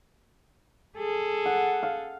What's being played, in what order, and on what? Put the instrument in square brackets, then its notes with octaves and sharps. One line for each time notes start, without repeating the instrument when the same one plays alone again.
[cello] G#4 A4
[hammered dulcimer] F#5
F5